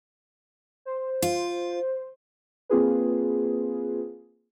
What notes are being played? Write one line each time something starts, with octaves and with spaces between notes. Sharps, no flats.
C5
F4
A#3 C4 F4 G#4 B4